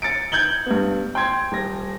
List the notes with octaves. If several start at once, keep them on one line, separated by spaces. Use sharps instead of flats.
A6 C#7 D7
G6 G#6 F#7 G7
G2 B3
G5 C6 G#6
D#1 A#6